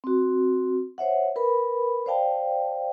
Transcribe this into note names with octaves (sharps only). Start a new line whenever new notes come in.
C4 F#4
C5 C#5 E5 F#5
A#4 B4 B5
C5 D5 F5 G5 A5